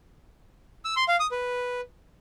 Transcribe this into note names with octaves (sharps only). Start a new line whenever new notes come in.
E6
C6
F5
D#6
B4